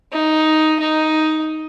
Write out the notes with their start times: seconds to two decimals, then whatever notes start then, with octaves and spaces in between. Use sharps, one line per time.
0.13 D#4
0.80 D#4